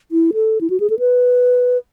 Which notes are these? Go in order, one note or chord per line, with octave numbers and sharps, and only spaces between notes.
E4
A4
E4
F#4
G#4
A4
B4